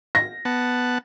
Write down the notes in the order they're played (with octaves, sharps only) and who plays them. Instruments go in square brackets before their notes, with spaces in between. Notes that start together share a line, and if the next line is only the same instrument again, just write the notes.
[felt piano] A#6
[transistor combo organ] B3 F#5 A5